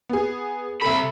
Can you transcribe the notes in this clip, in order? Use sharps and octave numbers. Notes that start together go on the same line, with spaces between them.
B3 G#4
C2 A4 E5 B5